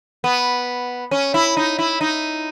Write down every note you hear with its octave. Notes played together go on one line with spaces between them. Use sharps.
B3
C#4
E4
D#4
E4
D#4